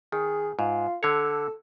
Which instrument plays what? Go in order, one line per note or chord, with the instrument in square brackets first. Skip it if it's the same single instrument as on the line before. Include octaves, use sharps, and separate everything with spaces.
[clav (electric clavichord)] D#3 [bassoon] G#4
[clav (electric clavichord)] G#2 [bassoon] F4
[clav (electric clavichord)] D3 C#5 [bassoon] A4